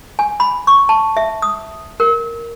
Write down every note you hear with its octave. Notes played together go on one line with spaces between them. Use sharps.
G#5
B5
C#6
A5
E5
D#6
A#4